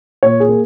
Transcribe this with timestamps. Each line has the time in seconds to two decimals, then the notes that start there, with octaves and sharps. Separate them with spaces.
0.23 A#2 C#5
0.40 G#4
0.49 A#3